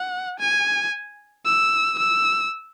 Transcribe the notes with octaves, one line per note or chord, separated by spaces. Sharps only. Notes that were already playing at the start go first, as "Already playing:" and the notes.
Already playing: F#5
G#5
E6
E6